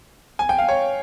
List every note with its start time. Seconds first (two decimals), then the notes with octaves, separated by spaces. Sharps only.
0.39 G#5
0.49 G5
0.59 F5
0.69 C#5